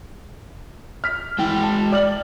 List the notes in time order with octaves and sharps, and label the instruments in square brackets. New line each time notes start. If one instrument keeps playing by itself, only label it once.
[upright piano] F6 B6
[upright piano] E3 [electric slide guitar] G#3 G5
[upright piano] A5
D5 F6 F#7